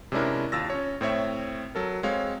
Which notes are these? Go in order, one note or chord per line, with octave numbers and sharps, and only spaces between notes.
C3 G#3 C#4 D4 E4 A#4
D#2 F4 E6 A6 A#6
C#4 C#5
A2 C4 C#5 E5
F#3 A4 A#4
G#3 C4 C#5 F5